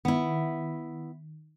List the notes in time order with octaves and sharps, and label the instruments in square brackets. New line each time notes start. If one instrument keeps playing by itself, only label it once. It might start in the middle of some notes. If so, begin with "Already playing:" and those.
[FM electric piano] D#3 [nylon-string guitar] B3 E4